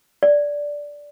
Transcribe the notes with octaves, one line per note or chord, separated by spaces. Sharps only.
D5